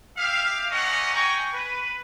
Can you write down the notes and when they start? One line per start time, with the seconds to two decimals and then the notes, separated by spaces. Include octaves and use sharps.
0.17 G4 E5 F5
0.71 A3 A#3 C#4 D#5 F#5
1.14 G#4 G5 G#5 A#5 C#6
1.53 B4